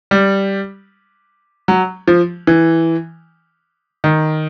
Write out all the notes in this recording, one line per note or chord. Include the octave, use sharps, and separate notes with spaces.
G3
F#3
F3
E3
D#3